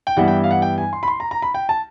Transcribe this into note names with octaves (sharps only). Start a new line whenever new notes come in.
G5
G2 E3 G3 B3 E4 F#5
G5
F5
F#5
G5
G#5
C6
B5
C6
A#5
A#5
B5
G5
A5